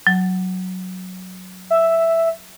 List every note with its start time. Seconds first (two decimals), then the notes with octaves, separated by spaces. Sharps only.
0.07 F#3
1.70 E5